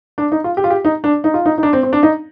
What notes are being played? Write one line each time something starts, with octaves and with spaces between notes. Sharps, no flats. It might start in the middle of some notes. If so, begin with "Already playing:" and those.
D4
D#4
F4
G4
F4
G4
D#4
D4
D#4
F4
D#4
D#4
D4
C4
C4
D4
D#4